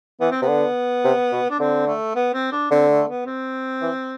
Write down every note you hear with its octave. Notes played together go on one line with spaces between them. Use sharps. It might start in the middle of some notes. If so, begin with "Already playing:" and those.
E3 B3
C4
C3 B3
D3
C3
B2
D4
D3 C4
A3
B3
C4
D4
D3 C4
A3
B3
C4
E3